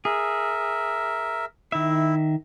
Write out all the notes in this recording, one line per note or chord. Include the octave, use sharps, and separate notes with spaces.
G#4 A#4 E5
D#3 E4 E5